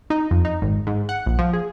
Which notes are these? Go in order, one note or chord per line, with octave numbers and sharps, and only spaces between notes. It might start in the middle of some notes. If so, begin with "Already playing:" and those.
D#4
F2
D#4
G#1
G#2
F#5
A#1
F3
G#4